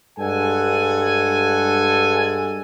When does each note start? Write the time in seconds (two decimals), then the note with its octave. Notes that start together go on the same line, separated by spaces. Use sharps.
0.19 G2 G#3 A4 F#5 G#5